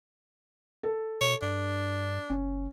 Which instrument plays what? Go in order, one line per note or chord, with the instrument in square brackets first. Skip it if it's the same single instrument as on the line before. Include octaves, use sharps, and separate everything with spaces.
[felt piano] A4
[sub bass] B2 [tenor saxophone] C#5
[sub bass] G2 [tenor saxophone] D4
[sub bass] F#1 [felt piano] C#4